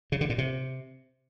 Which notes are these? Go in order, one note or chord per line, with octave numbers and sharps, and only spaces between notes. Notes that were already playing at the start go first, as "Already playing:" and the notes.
C#3
D3
A#2
C3